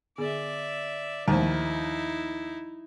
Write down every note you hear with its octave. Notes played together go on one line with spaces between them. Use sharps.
D3 B3 G#4 D5 E5
D#2 F3 A3 D#4 E4 C5